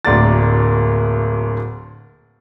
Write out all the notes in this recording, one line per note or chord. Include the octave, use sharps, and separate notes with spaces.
D1 D2 A#3 A#4 D5 A6